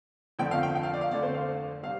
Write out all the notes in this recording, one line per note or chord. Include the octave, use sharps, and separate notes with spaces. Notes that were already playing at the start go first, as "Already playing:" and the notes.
F2 D3 F3 A3 G5
F5
G5
G5
F5
D5
F5
F2 D3 A3 D5
C5
F5
C3 G3 F5